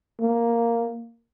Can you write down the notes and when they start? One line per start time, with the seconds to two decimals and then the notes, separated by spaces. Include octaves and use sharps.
0.20 A#3